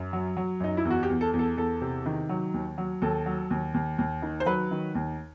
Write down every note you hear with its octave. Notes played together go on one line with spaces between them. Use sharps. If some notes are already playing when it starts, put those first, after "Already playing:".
Already playing: F#2
F#3
F#3
F#2 D#4
E4
E2
F#4
G4
E2
A4
E2
A4
E2 A4
C3
D#3
F#3
D#2
F#3
D#2 A4
F#3
D#2
D#2
D#2
D#3
C5
F#3 B4
D#3
D#2